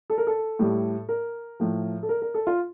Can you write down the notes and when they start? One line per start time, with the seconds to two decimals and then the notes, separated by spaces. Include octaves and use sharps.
0.10 A4
0.18 A#4
0.27 A4
0.59 A2 G3
1.09 A#4
1.60 A2 F3
2.03 A4
2.09 A#4
2.22 A#4
2.34 A4
2.47 F4